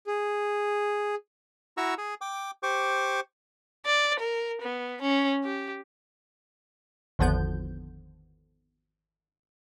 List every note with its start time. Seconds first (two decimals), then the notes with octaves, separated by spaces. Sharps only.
0.07 G#4
1.77 E4 F#4 A#5 C#6 E6
1.98 G#4
2.21 G5 D6
2.63 G4 C5 C#6 D6
3.86 D5
4.20 A#4
4.62 B3
5.02 C#4
5.44 G4
7.19 G#1 E2 D3 F3 B3 G6